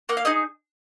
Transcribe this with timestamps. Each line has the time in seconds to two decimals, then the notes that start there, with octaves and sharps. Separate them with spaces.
0.09 A#3 F#5
0.17 F5
0.25 D#4 G#4 D#5